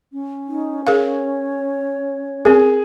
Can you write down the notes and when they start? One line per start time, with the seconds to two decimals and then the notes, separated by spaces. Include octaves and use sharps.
0.13 C#4
0.47 D#4
0.87 G#4 A#4 C#5 F5
2.45 C4 G#4 A#4